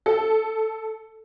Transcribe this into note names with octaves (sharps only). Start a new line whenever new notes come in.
A4